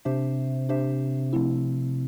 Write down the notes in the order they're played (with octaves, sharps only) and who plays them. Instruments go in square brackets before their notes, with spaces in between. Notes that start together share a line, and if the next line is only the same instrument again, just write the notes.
[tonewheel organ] C3 [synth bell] D4 G4 C5 E5
[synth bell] D4 G4 C5 E5
F3 A3 C4 E4